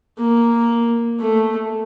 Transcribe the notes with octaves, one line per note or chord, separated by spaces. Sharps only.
A#3
A3